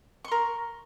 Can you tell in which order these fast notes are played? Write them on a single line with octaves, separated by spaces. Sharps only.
C#6 C6 A#4